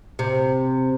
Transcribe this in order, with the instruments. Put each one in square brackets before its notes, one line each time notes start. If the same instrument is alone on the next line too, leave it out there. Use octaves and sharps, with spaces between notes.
[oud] C3